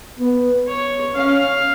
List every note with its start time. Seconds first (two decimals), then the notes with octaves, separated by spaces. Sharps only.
0.19 B3
0.68 C#5
1.15 C#4 F5